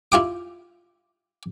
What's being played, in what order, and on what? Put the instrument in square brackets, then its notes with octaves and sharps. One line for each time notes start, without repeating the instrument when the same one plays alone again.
[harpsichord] E4 F4 G5 D6